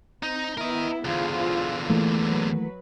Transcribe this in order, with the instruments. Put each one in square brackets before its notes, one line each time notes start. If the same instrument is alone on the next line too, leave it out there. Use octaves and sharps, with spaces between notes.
[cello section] C4 [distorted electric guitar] D#4
[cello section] B3 E4 [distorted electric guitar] A#4 D#5
[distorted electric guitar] E2 D3 [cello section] F4 G#4 C5
[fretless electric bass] E3 A3 A#3
[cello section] F#3 B4